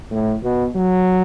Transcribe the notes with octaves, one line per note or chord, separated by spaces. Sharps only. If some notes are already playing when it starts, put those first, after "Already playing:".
A2
B2
F#3